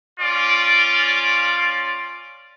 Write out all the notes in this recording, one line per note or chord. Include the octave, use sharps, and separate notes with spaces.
C#4 F4 D5